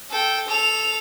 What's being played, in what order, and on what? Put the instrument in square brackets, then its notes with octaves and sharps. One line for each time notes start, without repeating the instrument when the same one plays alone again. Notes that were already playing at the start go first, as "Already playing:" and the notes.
[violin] A4 G5
A4 F7